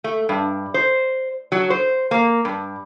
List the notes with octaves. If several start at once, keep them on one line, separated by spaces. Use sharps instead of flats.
A3
G2
C5
F#3
C5
A#3
G2